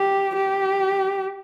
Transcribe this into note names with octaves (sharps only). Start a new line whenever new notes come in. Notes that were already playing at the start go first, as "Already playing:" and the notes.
Already playing: G4
G4